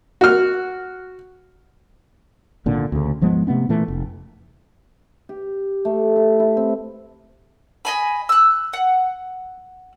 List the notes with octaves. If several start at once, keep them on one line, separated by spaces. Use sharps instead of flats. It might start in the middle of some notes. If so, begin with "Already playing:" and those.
F#4 F6
G#1 A#2 D3
D2 C#3
G#1 F3 G#3 B3
C3 A3 B3 C#4
A#2 E3 A3
F1
G4
A3
E4
E4
C4
D#5 G#5 B5
E6 F#6
F#5